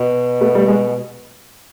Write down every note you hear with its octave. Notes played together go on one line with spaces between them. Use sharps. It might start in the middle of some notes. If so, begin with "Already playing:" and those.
Already playing: B2
A3 B3
G3 A3
G#3